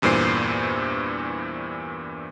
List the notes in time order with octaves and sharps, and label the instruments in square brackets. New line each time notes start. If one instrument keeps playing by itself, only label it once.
[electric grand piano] E2 G2 A#2 E3 C5 C7